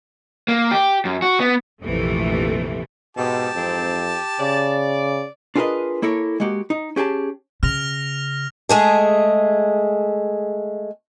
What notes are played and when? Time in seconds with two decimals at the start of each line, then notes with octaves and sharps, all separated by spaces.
0.48 A#3
0.71 G4
1.05 F#2
1.22 F#4
1.40 B3
1.84 A#1 F2 C3 E3 A3
3.17 G#2 B2 G4 A5
3.56 F2 G#2 E3 C4
4.40 C#3 D5
5.56 D4 F4 G#4 A#4 B4 D#5
6.02 A#3 E4 A4 A#4 C#5
6.40 G#3 A#3 F#4 G4
6.70 D#4
6.96 C#4 G4 G#4 G#5 A5
7.63 C#3 F6 A#6 F7
8.69 G#3 A3 G#4